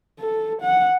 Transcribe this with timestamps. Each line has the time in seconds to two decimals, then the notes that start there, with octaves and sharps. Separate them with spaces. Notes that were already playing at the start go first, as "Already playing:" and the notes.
0.20 A4
0.61 F#5